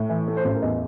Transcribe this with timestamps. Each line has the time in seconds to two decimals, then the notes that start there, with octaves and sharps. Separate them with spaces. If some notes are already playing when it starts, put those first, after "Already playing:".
Already playing: A2
0.09 E3
0.28 A3
0.37 C5
0.45 A1
0.54 A#4
0.62 E2 D#5